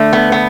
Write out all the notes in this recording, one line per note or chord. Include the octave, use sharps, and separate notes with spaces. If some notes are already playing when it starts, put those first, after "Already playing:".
Already playing: D3 A3
B3
B3